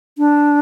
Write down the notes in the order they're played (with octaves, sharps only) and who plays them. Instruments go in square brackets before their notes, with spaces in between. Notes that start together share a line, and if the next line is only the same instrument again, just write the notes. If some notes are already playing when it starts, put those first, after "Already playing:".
[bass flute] D4